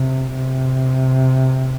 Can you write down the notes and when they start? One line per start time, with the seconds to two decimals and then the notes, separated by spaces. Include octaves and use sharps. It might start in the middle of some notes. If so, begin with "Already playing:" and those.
Already playing: C3
0.35 C3